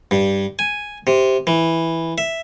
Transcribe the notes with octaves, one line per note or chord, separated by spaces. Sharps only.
G2
G#5
C3
E3
E5